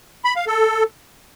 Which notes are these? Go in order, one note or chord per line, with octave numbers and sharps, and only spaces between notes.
B5
F5
A4